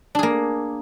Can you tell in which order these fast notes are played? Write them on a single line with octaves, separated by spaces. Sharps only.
D4 G#4 A#3